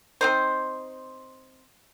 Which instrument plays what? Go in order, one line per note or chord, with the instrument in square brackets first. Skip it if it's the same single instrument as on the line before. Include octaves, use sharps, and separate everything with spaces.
[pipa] C4 D#4 C5